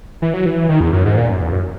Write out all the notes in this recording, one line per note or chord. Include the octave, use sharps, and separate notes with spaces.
E3
F#3
E3
D#3
E2
F#2
G#2
A#2
F#2
E2
F#2